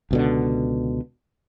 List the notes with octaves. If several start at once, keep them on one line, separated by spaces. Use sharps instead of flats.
C#2 B2 D3